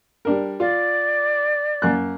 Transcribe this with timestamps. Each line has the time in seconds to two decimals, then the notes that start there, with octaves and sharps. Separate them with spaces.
0.25 G3 D4 A#4
0.60 F4 D5
1.82 F#2 A#3 F#6